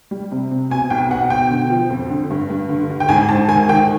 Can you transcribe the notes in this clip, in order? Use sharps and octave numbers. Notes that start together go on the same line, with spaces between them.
G3
C3
C3
B2 G#5
B1 G5
B2 F#5
B2 G5
D3
F3
F2
D3
G2
G2
D3
D3
G5
G#2 G#5
G#2 A5
D#3 G#5
D#3 G5